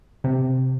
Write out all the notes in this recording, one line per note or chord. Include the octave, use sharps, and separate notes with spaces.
C3